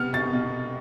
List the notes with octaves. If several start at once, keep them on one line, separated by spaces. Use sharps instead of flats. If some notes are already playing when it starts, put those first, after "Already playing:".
Already playing: C3 B3 F6
B2 A6
B2